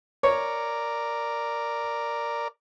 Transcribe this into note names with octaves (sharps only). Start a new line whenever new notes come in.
A#4 C#5 D5